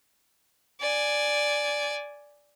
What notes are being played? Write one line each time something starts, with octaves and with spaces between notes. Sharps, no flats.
D5 G#5